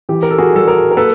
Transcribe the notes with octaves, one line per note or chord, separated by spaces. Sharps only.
E3 G4
A#4
A4
F#4 G#4
G3 A4
G#4 A#4
A#4
A#3 A4 B4